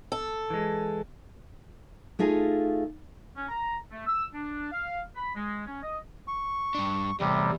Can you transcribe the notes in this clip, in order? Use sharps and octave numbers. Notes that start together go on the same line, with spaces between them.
A4
E3 G#3
A3 D#4 F4 G#4
C#4
A#5
A3
E6
D4
F5
B5
G#3
C#4
D#5
C#6
G2 D4
E2 A2 C3 G3